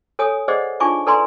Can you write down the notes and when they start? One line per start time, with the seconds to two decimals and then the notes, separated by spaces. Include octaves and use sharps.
0.19 A4 C#5 G#5 D#6
0.48 G#4 C5 D5 D#5 F#5
0.80 D4 D#4 F4 G#5 C#6 D6
1.07 A4 B4 D5 G#5 A#5 C6